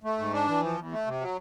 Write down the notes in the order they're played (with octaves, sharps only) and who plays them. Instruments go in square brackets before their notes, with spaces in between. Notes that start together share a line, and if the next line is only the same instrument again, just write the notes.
[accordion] A3
G#2
D4
E3
F3
E2
A3
C3
F#3